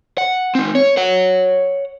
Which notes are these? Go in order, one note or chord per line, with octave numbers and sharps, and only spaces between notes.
F#5
C4 D#4
C#5
C#5 F#5